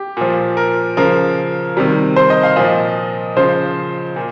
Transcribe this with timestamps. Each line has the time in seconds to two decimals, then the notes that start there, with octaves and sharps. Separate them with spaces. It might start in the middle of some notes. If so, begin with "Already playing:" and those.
Already playing: G4
0.17 A#2 F3
0.57 A#4
0.97 C#3 F3 A#4
1.77 C3 D#3 G3
2.16 C5
2.30 D#5
2.43 F5
2.56 A#2 F3 D#5
3.37 C#3 F3 C5
4.16 A#2